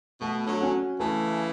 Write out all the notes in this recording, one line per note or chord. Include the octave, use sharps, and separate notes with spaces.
B2 A3
D3 F#3
C#4 F#4
C#3 E3 A3